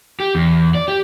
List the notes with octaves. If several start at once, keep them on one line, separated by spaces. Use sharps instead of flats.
G4
E2
D5
G4